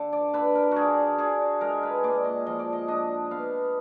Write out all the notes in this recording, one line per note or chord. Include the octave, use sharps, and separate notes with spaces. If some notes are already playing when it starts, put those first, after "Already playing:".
Already playing: D3
D5
D3 B4
A#4
D3 F#4 G#4
D3 G#4
G#3 A#4
B4
A#2 D5
D#5
F3 D#5
D5
D#5
D4 D#5
B3 F5